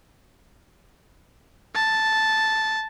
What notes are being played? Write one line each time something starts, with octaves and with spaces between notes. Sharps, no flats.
A5